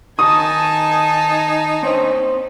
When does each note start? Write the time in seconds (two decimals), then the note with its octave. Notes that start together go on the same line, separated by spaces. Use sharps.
0.19 D#3 D#4 G#5 A5 D#6
1.83 C4 C5 C#5